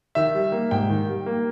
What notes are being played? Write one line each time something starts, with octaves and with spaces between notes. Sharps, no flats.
D#3 E5
G3
A#3
G#2 G5
D#3
G3
A#3